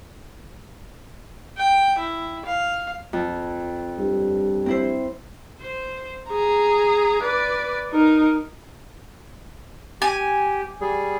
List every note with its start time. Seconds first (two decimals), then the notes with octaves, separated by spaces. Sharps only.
1.57 G5
1.98 E4
2.45 F5
3.13 F2
3.99 G2
4.66 C4 E4 C5
5.61 C5
6.29 G#4 A#5
7.22 B4 D5
7.91 D#4 A#4
10.02 G4 G#5
10.81 G3 G#4